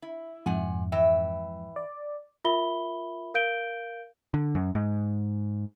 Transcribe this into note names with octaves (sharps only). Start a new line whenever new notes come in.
E4
F2 G#2 C3 F#5 G#5
E3 E5 G5
D5
F4 A#4 E5 B5 G7
A#4 F5 G6 D7 D#7 G7
D3
F#2
G#2